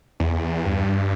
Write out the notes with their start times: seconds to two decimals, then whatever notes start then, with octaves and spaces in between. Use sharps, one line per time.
0.20 E2
0.65 G2